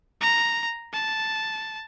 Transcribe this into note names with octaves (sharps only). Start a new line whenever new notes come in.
A#5
A5